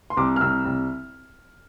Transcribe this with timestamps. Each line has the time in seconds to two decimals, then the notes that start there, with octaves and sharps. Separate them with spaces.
0.10 C6
0.17 C2 D6
0.36 F6
0.41 C2 E6
0.65 C2